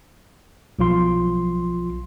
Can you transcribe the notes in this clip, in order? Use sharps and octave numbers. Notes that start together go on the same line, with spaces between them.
B1 F3 F4 C6